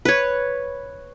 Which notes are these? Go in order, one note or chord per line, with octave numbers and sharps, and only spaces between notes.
B4 C#5